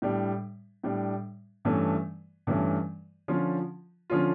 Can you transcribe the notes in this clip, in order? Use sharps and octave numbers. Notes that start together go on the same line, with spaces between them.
A2 G3 D4
A2 G3 D4
G2 E3 A3 C#4
G2 E3 A3 C#4
D3 F3 C#4 F4
D3 F3 C#4 F4